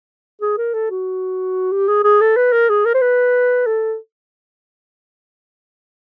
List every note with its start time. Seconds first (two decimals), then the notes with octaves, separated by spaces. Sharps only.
0.41 G#4
0.58 A#4
0.74 A4
0.90 F#4
1.72 G4
1.88 G#4
2.03 G#4
2.21 A4
2.36 B4
2.52 A#4
2.69 G#4
2.85 A#4
2.94 C5
3.01 B4
3.67 A4